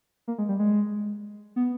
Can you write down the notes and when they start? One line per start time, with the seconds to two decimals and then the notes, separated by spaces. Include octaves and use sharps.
0.28 A#3
0.38 G#3
0.49 G3
0.59 G#3
1.56 B3